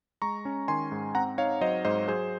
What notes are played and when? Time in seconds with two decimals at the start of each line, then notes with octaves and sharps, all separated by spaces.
0.22 G#3 A#5 C#6
0.45 C#4
0.68 D#3 G#5 C6
0.92 G#2
1.15 C4 F#5 A#5
1.38 D#4 C#5 F5
1.61 F#3 C5 D#5
1.85 G#2 C5 D#5
2.08 F#3 G#4 C5